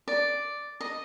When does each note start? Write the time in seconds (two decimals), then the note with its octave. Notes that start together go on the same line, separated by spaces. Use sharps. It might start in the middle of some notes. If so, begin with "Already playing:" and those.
0.08 D5
0.81 D#5